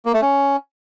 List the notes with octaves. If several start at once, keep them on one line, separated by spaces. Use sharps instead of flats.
A#3
A3
C#4